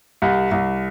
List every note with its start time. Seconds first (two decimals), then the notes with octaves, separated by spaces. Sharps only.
0.22 C2
0.52 C2